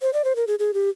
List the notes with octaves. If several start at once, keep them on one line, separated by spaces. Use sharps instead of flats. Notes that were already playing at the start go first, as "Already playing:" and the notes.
C5
D5
C5
A#4
G#4
G#4
G4